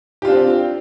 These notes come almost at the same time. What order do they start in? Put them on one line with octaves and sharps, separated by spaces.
G4 F4 D4 C4